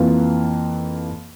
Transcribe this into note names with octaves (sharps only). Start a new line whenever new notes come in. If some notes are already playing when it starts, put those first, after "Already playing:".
Already playing: F2 E3 A#3 F4